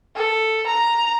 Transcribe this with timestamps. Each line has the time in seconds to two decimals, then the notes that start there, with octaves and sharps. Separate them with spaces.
0.16 A4
0.67 A#5